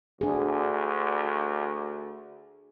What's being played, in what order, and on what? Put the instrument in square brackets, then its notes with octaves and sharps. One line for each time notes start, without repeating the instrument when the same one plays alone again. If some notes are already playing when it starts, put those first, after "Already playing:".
[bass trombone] D2 [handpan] D4 G#4